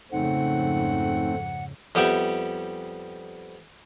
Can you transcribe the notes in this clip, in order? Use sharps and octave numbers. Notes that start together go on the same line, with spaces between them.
F2 G#2 C#3 A3 C4 D#4 F#5
F2 G3 B3 G4 E5